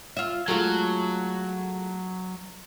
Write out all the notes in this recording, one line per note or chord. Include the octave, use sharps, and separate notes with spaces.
F4 E5
F#3 G#3 A3 F4